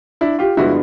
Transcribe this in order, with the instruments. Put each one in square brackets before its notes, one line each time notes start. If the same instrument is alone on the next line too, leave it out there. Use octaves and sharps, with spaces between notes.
[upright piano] D4 E4
F4 G4
G2 D3 F3 G#3 B3 E4 F#4